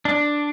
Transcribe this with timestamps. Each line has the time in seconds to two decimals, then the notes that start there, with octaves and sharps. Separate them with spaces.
0.05 D4